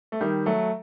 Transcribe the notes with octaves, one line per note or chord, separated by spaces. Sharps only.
A3
D#3 G3
F#3 A3